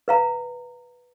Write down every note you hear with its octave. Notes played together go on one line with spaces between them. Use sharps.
B4 F5 A#5